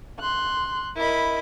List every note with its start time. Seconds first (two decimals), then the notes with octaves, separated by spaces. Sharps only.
0.20 C6 F#6
0.96 E4 A#4 D#5 B5